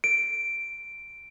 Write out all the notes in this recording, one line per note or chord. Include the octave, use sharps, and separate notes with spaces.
D7